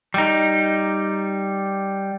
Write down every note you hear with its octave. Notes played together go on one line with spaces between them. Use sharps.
G3 D#4